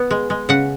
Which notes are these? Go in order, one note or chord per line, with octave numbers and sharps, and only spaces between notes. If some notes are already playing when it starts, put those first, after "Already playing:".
Already playing: B3
G#3
G#3
C#3 F#5